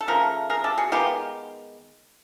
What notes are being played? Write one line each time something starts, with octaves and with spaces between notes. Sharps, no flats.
A4
C#3 F3 A3 A#4
G#4 A#4
G4 A4
F#4 G#4
D#3 G#3 B3 F4 G4